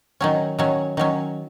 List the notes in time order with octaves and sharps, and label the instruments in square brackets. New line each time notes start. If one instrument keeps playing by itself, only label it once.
[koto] D#3 F#3 C#4
D#3 F#3 C#4
D#3 F#3 C#4